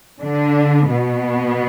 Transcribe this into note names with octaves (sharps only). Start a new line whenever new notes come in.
D3 D4
B2 B3